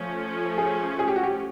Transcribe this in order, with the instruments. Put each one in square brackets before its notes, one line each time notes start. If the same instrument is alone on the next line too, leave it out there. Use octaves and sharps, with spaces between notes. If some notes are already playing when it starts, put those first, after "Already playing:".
Already playing: [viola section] F3 A3 C#4
[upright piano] G#4
G#4
G4
F#4
G4